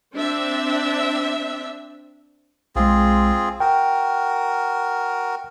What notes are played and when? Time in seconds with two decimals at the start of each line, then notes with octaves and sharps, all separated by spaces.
0.14 C4 D4 E5
2.76 B1 G#3 C4 F4 G#4
3.60 F#4 A#4 G5